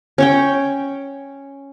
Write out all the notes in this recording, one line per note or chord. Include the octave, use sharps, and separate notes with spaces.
C#4 C#5 G5